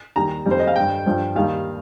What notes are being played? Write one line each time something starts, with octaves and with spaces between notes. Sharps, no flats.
D#2 D#3 G3 A#5
F2 D#3 G3
C5
D#5
F5
G2 G3 G5
G2 F3
D#2 D#3 G3 F5